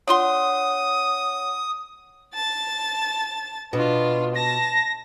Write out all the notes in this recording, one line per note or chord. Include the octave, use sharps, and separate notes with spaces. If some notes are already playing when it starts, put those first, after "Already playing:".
D4 F4 C#5 F#5 C6 D#6
A5 A6
B2 D4 F4
A5 A#6